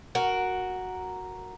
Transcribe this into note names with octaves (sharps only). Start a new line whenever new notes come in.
F#4 A#4